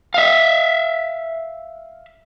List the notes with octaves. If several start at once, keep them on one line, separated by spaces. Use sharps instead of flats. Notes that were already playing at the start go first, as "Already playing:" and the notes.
E5 F5